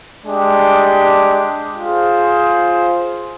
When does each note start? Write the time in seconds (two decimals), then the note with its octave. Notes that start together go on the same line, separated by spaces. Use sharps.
0.25 G#3 D4 G4
1.76 F4 G#4 C5